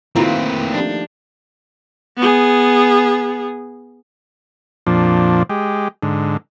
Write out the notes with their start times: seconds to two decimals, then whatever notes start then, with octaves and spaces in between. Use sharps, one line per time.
0.16 D#3 A3 A#3 C4 E4 F#4 B4
0.70 F3 D4 G4
2.17 B3 G#4
4.87 F2 A#2 F3 D4
5.50 G#3 G4
6.03 G#2 D3